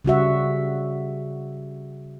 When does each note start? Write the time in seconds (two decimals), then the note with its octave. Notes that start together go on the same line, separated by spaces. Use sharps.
0.05 C#3 G3 F#4 E5